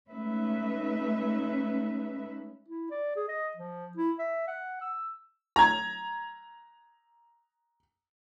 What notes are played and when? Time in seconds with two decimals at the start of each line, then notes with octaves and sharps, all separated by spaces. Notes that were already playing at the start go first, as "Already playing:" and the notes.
0.10 G#3 A3 C#4 D#4 B4 E5
2.68 E4
2.91 D5
3.16 G#4
3.28 D#5
3.57 F3
3.97 E4
4.19 E5
4.47 F#5
4.81 E6
5.56 A#5 G#6